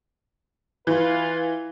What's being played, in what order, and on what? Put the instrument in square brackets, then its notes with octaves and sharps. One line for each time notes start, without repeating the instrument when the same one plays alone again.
[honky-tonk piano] E3 [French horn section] F4 B4